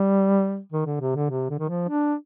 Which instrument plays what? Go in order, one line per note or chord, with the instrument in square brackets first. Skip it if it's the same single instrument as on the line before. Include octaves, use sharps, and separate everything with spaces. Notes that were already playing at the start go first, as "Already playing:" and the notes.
Already playing: [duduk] G3
D#3
D3
C3
D3
C3
D3
D#3
F3
D4